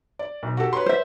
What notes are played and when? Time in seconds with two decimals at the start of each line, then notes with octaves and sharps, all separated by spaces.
0.19 D5
0.43 B1
0.57 F#4 G4 A4
0.73 B4 C#5 C6
0.86 C5 E5